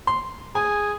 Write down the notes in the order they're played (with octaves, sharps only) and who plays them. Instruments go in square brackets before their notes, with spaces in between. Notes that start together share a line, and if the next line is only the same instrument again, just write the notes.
[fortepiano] C6
[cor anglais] G#4 [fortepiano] G#5